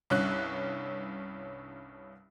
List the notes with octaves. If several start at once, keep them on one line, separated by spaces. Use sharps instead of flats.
C2 G2 C#4 F#6